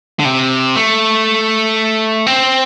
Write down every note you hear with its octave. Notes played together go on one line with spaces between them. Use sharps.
D3
C3
A3
C4